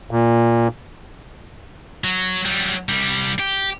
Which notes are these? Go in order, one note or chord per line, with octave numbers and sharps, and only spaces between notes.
A#2
F#3
F#3 G3
C2 G3
G4